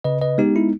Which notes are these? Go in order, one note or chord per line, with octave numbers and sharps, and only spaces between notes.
C#3 B4 D#5
B4 D#5
G#3 B3 D#4 G4
E4